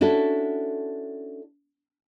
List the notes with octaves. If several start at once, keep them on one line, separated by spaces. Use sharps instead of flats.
C#4 D4 E4 F#4 A4